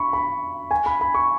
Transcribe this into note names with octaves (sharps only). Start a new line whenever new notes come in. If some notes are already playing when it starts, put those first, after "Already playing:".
Already playing: B5 C#6
B5
G#5
B5
B5
C#6